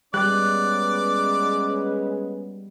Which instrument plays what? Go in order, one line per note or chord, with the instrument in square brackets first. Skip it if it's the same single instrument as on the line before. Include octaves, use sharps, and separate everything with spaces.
[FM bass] G3 [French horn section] G#3 B3 C#4 [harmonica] D5 [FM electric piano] F#6